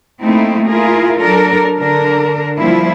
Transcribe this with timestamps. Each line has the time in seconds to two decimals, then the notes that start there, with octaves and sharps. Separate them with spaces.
0.21 A3 A#3 C4 D#4 E4
0.65 E4 F4 G#4 A#4
1.17 F#3 D4 A4 A#4
1.77 D3 D4 A#4
2.59 F3 G3 A#3 E4 F4